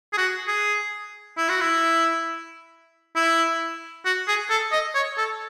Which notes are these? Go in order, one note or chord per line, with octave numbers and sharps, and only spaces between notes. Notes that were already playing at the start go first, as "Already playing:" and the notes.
G#4
F#4
G#4
E4
F#4
E4
E4
F#4
G#4
A4
D#5
C#5
A4